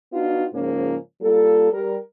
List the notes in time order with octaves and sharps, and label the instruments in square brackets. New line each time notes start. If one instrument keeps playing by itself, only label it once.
[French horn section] B3 D4 D#4 F4 F#4
G#2 C#3 F3 A#3 C#4
G3 A#3 F4 A4
G3 A#4